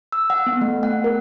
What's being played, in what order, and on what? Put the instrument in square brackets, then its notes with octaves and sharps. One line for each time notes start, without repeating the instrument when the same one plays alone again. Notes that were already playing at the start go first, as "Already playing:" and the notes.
[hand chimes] E6
F#5
B3
A3
F#5
A#4